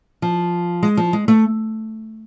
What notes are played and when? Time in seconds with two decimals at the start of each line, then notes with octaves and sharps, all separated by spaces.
0.22 F3
0.83 G#3
0.97 F3
1.13 G#3
1.28 A3